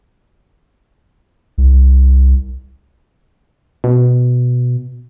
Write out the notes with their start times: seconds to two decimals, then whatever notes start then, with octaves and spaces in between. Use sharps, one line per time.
1.58 C2
3.84 B2